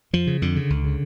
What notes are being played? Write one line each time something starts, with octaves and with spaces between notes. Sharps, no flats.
F2 F3
C#3
F2 D3
C#3
C#2
C#3